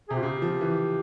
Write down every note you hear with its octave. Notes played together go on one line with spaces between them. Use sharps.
C3 G#4
F4
C#3 G4
F3
E3